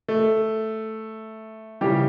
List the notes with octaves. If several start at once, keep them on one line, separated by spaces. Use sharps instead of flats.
A3
C#3 E3 G3 G4